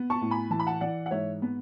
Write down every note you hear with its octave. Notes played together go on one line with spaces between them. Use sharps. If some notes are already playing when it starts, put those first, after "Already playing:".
Already playing: B3
A5 C#6
A2
G#5 B5
E3 A5
B5
F#5 A5
E3 D5 F#5
F#5
G#2 C#5 E5
B3